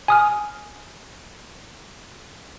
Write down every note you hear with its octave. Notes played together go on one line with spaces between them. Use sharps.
G#5 D#6 F6